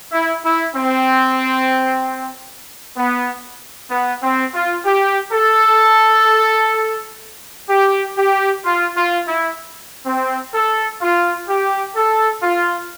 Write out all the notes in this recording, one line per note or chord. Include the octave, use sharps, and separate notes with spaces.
E4
E4
C4
B3
B3
C4
F4
G4
A4
G4
G4
F4
F4
E4
C4
A4
F4
G4
A4
F4